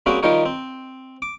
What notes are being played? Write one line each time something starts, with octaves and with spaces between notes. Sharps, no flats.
G3 A#3 C4 C#4 F#4 G#4
D#3 F3 G3 D#4 A#4 C#5
C4
D6